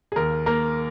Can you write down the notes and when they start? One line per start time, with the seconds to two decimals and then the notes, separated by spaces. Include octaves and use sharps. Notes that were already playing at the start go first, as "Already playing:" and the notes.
0.12 G#4
0.16 D#2 A#4
0.46 A#3 A#4